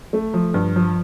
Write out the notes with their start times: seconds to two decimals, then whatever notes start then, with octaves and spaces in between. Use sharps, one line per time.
0.13 A3
0.34 F3
0.54 G2
0.76 F3